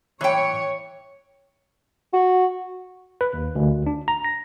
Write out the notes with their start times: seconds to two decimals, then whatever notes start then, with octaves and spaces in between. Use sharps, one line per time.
0.21 E3 C#5 G5
2.13 F#4
3.21 B4
3.33 D#2
3.55 D2
3.86 D4
4.08 A#5
4.24 A#6